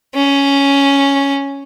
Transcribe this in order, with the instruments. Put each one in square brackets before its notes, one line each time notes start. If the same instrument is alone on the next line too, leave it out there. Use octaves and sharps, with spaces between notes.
[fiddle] C#4